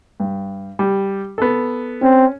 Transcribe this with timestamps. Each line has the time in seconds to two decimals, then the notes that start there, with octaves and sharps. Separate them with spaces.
0.20 G2
0.79 G3
1.38 B3 A4
2.02 C4 C#4